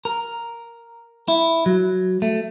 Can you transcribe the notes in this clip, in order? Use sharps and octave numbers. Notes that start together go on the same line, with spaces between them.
A#4
E4
F#3
A3